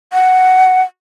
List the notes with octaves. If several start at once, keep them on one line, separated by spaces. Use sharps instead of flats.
F#5